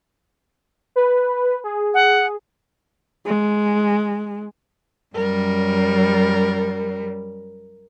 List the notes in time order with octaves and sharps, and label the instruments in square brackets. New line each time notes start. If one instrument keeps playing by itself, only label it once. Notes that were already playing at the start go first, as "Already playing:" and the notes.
[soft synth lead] B4
G#4
[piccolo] F#5
[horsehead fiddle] G#3
[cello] F#2 G3 [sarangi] A#4